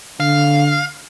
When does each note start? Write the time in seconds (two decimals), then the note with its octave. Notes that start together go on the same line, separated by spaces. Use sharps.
0.20 D3 F5